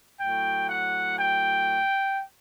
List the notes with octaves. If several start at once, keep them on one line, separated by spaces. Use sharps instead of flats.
A2 F#3 G5
F#5
G5